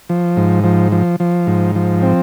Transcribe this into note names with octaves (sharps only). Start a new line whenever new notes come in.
F3
G#2
F3
F3
F3
G#2
F3
C4